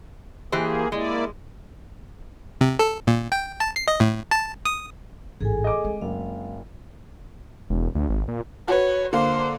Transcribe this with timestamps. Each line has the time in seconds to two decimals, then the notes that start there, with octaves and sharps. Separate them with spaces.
0.52 E3 A#3 G4 G#4 C5
0.92 G#3 A#3 E4 D5
2.61 C3
2.79 A4
3.07 A#2
3.32 G5
3.60 A5
3.76 C7
3.88 D#5
4.00 A2
4.31 A5
4.65 D#6
5.40 A1 G#2 G#4 A4 G#5
5.64 D#5 D6
5.84 G#3 C4
6.01 F#1 F5
7.70 E1
7.95 D2
8.09 G#1
8.28 A#2
8.68 F#4 B4 C#5
9.13 D3 A#3 F4 C5